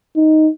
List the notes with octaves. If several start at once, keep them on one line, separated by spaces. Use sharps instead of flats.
D#4